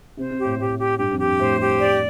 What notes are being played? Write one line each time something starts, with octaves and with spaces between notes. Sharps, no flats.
C3 C5
C3
G4
A2
A2 G4
G4
G2 G4
F2
G4
G2
A2 C5
G4
D5